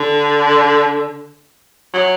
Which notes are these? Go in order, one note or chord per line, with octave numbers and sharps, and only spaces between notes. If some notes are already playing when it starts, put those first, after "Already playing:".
Already playing: D3
F#3